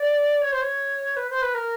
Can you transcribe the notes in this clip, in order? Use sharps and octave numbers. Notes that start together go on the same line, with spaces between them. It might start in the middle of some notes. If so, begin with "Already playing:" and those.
Already playing: D5
C#5
C5
C#5
B4
C5
B4
A#4